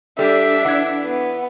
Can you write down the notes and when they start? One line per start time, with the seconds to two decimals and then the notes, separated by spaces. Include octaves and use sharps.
0.19 G3 D4 A4 E5
0.65 E3 F#5 G#6
1.04 B3